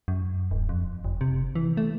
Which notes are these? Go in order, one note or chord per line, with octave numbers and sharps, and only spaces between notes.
F#2
D1
F2
F#1
C3
E3
A3